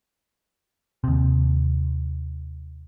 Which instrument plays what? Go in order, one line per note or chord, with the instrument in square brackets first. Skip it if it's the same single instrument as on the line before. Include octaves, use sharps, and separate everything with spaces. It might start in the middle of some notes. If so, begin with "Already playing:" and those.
[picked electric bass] D#2 C3